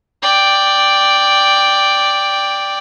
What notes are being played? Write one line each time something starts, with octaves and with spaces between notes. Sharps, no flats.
D5 G5